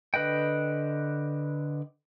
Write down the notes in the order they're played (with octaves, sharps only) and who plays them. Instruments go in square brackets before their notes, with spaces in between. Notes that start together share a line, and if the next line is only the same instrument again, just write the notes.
[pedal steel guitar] D3 B4 D#5 G5